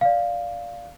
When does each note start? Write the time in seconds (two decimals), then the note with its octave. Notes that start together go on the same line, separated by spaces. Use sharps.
0.01 D5 F5